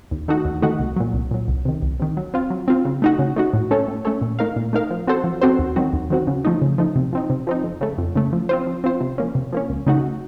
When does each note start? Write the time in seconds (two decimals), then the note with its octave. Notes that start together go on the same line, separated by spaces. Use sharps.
0.11 D#2
0.28 D#3 A3 D#4 F#4
0.45 D#2
0.62 D#3 A3 D#4 F#4
0.80 C2
0.96 A#2 F#3
1.14 C2
1.31 A#2 F#3
1.48 C2
1.65 C3 D#3
1.82 C2
2.00 C3 D#3
2.17 F#3
2.34 C4 F4
2.50 F#3
2.68 C4 F4
2.85 C#3
3.02 A3 D#4 F#4
3.19 C#3
3.36 A3 D#4 F#4
3.53 A2
3.71 A3 C#4 A4 C#5
3.88 A2
4.05 A3 C#4 A4 C#5
4.22 A#2
4.39 A3 D#4 A#4 F5
4.56 A#2
4.73 A3 D#4 A#4 F5
4.90 F3
5.07 C4 F#4 A4 C5
5.24 F3
5.42 C4 F#4 A4 C5
5.59 D#2
5.76 D#3 F#3 C4 F#4
5.93 D#2
6.10 D#3 F#3 C4 F#4
6.27 C#3
6.45 F3 A3 D#4
6.62 C#3
6.78 F3 A3 D#4
6.96 C3
7.13 F3 C4 D#4
7.30 C3
7.47 F3 C4 D#4
7.64 F2
7.81 C#3 A3
7.98 F2
8.16 C#3 A3
8.33 F3
8.49 C4 F4 C5
8.67 F3
8.84 C4 F4 C5
9.01 C3
9.18 F3 A#3 C#4
9.35 C3
9.53 F3 A#3 C#4
9.69 C#2
9.87 C#3 A3 D#4 F#4